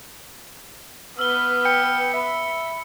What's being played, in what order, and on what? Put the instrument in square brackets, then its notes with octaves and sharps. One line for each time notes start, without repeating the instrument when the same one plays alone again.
[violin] B3 B4 [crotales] E6 G7 [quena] F6
[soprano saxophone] G5 [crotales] C#7
[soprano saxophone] E5 [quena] B5